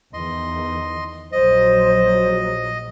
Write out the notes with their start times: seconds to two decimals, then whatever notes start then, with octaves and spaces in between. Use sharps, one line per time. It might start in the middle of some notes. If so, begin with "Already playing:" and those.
0.13 E2 D#3 D#5 C6
1.32 A#1 F#3 C5 D#5